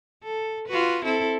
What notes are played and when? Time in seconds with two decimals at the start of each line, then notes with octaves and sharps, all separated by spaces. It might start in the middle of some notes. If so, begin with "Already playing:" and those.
0.23 A4
0.68 F4 F#4 B4
1.05 C4 E4 A4